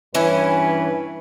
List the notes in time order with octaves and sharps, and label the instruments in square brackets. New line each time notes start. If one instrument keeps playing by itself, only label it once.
[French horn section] G2 B4 [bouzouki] E3 C#4